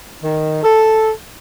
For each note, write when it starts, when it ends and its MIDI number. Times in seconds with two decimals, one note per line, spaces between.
0.23 0.60 51
0.63 1.10 69